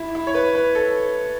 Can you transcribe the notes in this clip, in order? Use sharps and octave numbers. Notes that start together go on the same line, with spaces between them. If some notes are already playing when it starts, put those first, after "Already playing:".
Already playing: E4
E4
C#5
B4
B4
A4